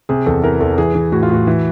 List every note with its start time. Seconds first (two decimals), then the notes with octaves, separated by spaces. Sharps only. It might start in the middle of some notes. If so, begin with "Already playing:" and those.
0.09 C3 G#4
0.26 E2 A4
0.43 E3 A#4
0.60 E2 A4
0.78 E3 G#4
0.95 E3
1.12 A2 F#4
1.23 F4
1.29 A2 F#4
1.47 E3